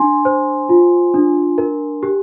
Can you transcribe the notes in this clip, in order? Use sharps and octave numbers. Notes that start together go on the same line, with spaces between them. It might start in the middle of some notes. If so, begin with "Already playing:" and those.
Already playing: D4 G#5 C6
C5
F4
D4
A#4
G4